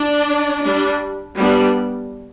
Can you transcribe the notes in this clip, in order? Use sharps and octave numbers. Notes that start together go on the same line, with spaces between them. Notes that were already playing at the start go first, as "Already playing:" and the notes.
Already playing: D4
G3 D4
G3 B3 D4